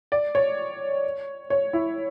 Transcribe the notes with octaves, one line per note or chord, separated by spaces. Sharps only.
D5
C#5
C#5
E4